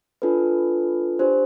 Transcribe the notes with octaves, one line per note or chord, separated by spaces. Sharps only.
D4 F4 A4 B4
D4 G4 C5